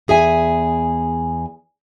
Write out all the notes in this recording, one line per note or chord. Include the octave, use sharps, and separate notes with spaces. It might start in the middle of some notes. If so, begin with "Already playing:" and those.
E2 G#4 E5 G#5